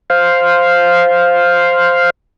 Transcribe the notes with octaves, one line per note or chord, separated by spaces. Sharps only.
C5 F5